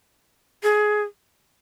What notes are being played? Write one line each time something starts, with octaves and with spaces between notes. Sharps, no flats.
G#4